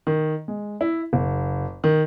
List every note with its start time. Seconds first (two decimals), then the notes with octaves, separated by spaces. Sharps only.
0.07 D#3
0.48 G#3
0.81 E4
1.13 F#1
1.84 D#3